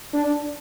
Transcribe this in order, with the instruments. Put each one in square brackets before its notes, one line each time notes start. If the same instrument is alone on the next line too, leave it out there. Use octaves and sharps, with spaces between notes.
[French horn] D4